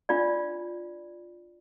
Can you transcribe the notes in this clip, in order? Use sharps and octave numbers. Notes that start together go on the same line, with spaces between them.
D4 F4 D5